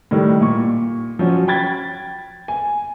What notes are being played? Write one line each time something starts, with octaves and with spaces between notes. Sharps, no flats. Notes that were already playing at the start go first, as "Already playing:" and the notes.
A2 D#3 G3
A#2 C#6
F3 F#3 C#4
G5 B5 G#6 A6
G#5